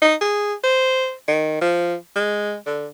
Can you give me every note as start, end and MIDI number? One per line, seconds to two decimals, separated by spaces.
0.02 0.15 63
0.21 0.54 68
0.64 1.13 72
1.28 1.57 51
1.61 1.94 53
2.16 2.56 56
2.66 2.87 50